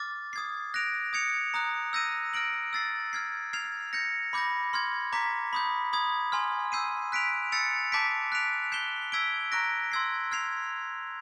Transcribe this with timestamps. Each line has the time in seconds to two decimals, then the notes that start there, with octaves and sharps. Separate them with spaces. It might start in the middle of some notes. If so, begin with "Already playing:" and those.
Already playing: D6 F6 A6
0.33 D#6 G#6 C7
0.74 F#6 A#6 D7 F7
1.13 D#6 G#6 C#7 F7
1.54 A#5 D#6 F#6
1.93 E6 G6 A#6 D#7
2.34 F6 A#6 D7 F#7
2.73 E6 A6 C7
3.13 F6 G#6 C7
3.53 F6 G#6 C7 F7
3.93 G6 A#6 C#7
4.33 B5 D6 G6 A#6
4.73 C6 F6 G#6
5.12 A#5 D6 G6 B6
5.53 B5 D#6 G6
5.93 B5 D#6 G#6
6.32 G#5 C6 F6
6.72 E6 G6 C7 D#7
7.12 F#6 B6 D7 F7
7.52 E6 A6 C#7 F7
7.92 A5 D6 G6 B6 D7
8.32 F#6 B6 D7 F7
8.72 G6 C7 E7 G7
9.12 E6 G#6 B6 D7 G7
9.52 A#5 C#6 F#6 A#6 D7
9.92 C6 E6 G#6 C7
10.31 F6 G#6 C7 F7